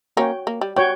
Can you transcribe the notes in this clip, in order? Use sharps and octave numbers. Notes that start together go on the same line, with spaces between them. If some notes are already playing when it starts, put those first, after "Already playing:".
A#3 C#4 F#4 C#5 G5
A#3
G3
G3 F#4 C#5 G5